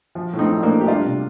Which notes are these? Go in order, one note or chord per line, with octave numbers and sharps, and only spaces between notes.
F3
A2
C4 D#4
F3
A#3 D4
A2
G4
G3 D4 F4
C3